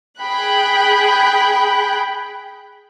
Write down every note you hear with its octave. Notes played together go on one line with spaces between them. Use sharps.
G#4 G5 B5 F#6